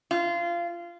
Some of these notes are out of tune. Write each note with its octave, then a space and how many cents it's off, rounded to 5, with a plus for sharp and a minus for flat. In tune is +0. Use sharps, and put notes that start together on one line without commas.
F4 -20